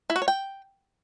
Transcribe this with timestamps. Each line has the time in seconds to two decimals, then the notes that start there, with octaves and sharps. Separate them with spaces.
0.10 E4
0.16 F#4
0.22 C#5
0.28 G5